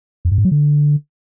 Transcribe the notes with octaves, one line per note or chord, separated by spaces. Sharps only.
F2
G2
G#2
F#3
D3